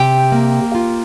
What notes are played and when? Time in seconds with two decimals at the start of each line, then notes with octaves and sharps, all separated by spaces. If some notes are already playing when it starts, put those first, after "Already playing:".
Already playing: C3 G4 G5
0.32 A#3
0.75 F4